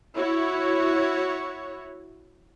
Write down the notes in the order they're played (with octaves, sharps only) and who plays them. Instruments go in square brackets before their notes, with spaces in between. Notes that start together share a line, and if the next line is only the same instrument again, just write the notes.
[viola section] E4 F#4 C#5